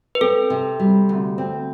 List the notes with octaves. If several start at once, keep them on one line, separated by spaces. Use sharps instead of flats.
B4
C4 A4
C3
G3
D2
C4